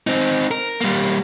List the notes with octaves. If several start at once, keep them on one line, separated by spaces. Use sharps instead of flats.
C4 D#4
A#4
G3 A#3